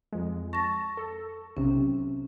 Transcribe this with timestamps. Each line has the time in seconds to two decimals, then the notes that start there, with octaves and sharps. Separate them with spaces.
0.13 F2 G#3
0.53 A5 C#6 A#6
0.97 A4
1.57 B1 C3 C#4